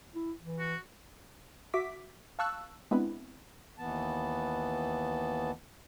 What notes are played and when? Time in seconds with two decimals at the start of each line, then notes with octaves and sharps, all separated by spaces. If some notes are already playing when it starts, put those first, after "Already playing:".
0.15 E4
0.40 E3
0.59 F#4
1.74 F#4 E5 D6 B6
2.39 F5 A5 C#6 E6 F#6
2.91 G#3 B3 C4 D4 E4 B4
3.77 D#2 E3 B3 A5